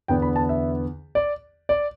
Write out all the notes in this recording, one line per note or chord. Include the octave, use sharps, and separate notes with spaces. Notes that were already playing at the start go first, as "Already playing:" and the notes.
E2 D3 B3 G5
B5
A5
E5
D5
D5